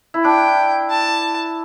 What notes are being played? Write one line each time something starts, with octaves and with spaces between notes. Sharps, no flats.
E4
D4 G5
A5